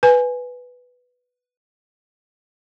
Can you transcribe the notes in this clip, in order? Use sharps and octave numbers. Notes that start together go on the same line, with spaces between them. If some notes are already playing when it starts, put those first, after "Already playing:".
B4 G#5